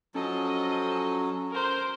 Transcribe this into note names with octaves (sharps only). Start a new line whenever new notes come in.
F3 F#3 C#4 A4 D#5
A#4 C5